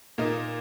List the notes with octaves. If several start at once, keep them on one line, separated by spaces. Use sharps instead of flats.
A#2 A#3 D#4